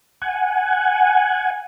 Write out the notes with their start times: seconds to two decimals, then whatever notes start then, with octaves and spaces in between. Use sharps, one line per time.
0.22 F#5 G#5